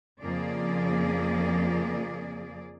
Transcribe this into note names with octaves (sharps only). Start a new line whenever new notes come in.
F2 C#3 F3 A#3 G#4 D5